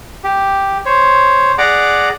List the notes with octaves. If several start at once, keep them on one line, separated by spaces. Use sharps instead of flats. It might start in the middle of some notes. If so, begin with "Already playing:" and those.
G4
C5 C#5
G#4 D5 F#5 A#5 D6